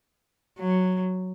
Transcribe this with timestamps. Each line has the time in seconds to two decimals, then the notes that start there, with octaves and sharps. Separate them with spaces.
0.59 F#3